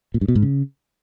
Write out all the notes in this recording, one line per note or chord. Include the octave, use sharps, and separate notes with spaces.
A#2
G2
B2
G#2
C#3